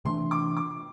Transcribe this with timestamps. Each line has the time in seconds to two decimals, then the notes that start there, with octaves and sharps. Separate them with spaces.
0.05 C3 E3 A3 D4 C6
0.31 D6
0.57 D6